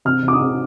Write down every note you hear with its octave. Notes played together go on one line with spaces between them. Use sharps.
C3 F6
C3
D6
D#6
C3